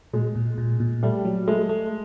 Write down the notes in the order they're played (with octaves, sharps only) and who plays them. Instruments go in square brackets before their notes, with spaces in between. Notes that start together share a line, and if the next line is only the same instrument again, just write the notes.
[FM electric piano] A#2 [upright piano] G#3
[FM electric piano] A#2
A#2
A#2
[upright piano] G3 [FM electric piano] A3
[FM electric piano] F#3
[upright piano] G#3 [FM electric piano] A3
[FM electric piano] A3